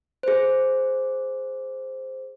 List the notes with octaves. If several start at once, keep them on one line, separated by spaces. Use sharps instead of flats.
G#4 C5